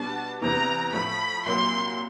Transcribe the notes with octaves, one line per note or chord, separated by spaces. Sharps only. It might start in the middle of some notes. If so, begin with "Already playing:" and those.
Already playing: B2 G3 B3 D4 A5
E2 C3 E3 A#5
A2 F3 A3 B5
C2 A#2 F#3 A#3 C6